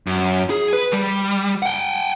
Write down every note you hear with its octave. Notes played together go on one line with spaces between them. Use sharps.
F#2
G#4
B4
G3
F#5 G5